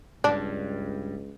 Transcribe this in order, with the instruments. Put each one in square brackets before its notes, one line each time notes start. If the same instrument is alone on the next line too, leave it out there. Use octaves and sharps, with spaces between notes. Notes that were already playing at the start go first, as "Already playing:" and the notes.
[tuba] C#2 [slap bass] G2 [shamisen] D4